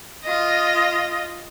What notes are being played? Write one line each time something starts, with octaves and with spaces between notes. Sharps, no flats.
F4 D#5